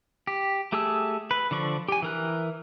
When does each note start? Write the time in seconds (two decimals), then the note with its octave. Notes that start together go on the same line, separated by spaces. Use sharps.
0.27 G4
0.72 A3 G4 G#4 A5 E6
1.31 B4
1.51 D3 F3 D5 C#6
1.89 G4 G#5
2.02 E3 A#4 F#6